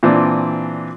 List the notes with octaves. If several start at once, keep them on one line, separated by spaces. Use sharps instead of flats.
A#2 E3 C4 D4